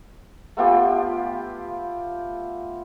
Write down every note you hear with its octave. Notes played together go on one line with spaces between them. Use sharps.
A3 B3 F4 G4